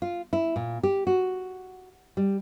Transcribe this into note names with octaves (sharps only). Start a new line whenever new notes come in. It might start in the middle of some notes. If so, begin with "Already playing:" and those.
F4
E4
A#2
G4
F#4
G3